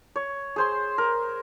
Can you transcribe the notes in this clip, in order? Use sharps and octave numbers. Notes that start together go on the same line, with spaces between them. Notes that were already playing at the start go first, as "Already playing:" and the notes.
C#5
G#4 C5 C6
A#4